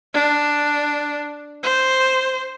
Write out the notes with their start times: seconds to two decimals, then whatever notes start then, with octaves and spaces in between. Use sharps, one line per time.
0.14 D4
1.63 C5